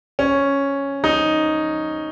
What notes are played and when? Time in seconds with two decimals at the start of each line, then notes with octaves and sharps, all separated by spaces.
0.19 C#4
1.04 D#4